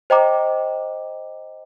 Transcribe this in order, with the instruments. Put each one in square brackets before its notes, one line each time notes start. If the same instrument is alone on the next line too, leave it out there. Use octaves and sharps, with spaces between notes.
[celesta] C5 D#5 G5 A#5 D6